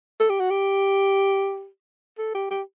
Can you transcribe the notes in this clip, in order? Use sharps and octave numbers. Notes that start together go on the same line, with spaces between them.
A4
G4
F#4
G4
A4
G4
G4